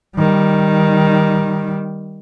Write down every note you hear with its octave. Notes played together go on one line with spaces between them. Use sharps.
D#3 G3